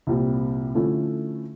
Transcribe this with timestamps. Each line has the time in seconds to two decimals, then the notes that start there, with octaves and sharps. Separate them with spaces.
0.07 C2 A#2 G3 C4
0.74 D3 F3 A3 C#4 E4